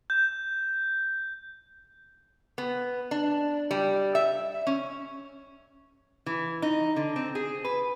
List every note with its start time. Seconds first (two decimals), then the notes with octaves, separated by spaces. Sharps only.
0.10 G6
2.58 B3
3.11 D4
3.71 G3
4.15 E5
4.67 C#4
6.26 E3
6.62 D#4
6.96 D3
7.16 C4
7.35 G#4
7.65 B4